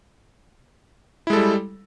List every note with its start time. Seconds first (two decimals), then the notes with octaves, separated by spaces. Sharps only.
1.27 E4
1.30 G#3
1.33 A4
1.36 G3